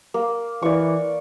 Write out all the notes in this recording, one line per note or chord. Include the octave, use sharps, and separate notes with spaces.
A#3
E3 D5 C#6